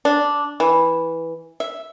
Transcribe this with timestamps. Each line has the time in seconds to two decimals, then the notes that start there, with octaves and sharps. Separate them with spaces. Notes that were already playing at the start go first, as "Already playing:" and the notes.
0.05 D4
0.60 E3
1.60 E5